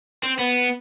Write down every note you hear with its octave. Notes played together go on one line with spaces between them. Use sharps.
C4
B3